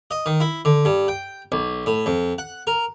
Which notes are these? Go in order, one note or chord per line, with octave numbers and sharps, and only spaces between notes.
D#5
D#3
E4
D3
G2
G5
B1
A2
F2
F#5
A#4